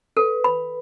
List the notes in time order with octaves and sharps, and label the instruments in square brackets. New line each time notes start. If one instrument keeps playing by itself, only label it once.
[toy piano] A4 [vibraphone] B4
[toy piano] B5